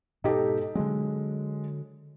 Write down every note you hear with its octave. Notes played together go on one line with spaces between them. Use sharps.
G#2 B2 D#4 G4 A4
D3 F#3 G#3